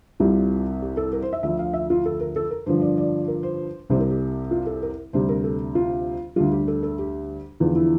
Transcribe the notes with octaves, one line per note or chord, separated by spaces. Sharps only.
C2 C3 G3 F4
G4
A4
A#4
C5
E5
D2 D3 F3 E5
F5
E5
F4
A4
A#4
A4
A#4
G2 D3 F3 C5
D5
D5
A#4
C5
C2 C3 G3 C5
A#4
G4
F4
A4
A#4
D2 C3 G3 C5
A#4
A4
F4
D2 D3 G3 F4
G4
A4
A4
G4
E2 D3 F3 F4
E4